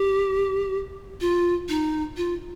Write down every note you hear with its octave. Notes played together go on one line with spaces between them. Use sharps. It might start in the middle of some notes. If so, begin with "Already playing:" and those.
Already playing: G4
F4
D#4
F4